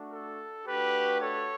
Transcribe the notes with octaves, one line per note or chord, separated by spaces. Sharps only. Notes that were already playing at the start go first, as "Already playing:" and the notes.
Already playing: A3 D4 F#4
A4
A3 D4 F#4 G4 B4
A4 C#5